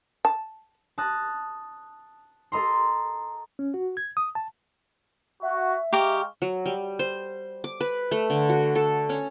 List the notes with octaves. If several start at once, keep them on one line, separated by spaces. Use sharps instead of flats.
A5
A5 D#6 F#6 A#6
A4 D#5 A#5 C6
C#4
F#4
G#6
D#6
A5
F#4 E5
G#3 G4 F5 A#5 C#6 D6
F#3
G3
C5
D6
B4
A3
D3
F#4
A4
C#4